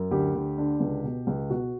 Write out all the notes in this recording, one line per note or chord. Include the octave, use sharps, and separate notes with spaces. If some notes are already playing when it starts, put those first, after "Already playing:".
Already playing: F#2
D2 G4
D2
D3
C#2
B2
C#2
B2 F#4